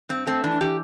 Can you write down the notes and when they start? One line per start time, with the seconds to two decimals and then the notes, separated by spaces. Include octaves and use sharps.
0.09 G2 C4
0.27 A3 C4
0.44 E3 D4
0.61 E3 G4